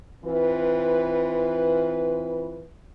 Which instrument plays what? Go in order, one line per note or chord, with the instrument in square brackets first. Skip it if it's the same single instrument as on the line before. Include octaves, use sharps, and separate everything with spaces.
[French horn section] E3 C4 F4 B4